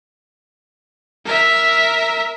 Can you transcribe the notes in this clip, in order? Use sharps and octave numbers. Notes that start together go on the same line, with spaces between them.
A#4 E5